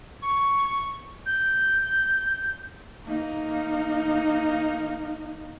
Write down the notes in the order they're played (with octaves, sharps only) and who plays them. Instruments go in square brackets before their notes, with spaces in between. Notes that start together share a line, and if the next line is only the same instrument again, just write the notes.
[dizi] C#6
G6
[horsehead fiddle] A#3 D#4